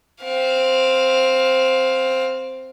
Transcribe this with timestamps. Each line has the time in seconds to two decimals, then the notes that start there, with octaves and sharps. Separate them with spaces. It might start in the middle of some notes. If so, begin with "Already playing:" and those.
0.24 C4 F5